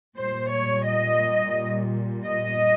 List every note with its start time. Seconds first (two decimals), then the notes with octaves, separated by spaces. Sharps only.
0.16 A#2 G3 C5
0.51 C#5
0.86 D#5
2.25 D#5